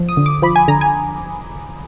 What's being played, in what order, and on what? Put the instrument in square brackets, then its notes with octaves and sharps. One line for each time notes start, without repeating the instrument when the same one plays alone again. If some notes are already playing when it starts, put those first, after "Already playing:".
Already playing: [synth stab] F3
D#6
D3
D6
F3 B5
G#5
D3 A#5
G#5